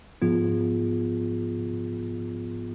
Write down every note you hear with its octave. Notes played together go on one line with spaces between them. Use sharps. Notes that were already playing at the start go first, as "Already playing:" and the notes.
G#2 F3 B3 F4 G#4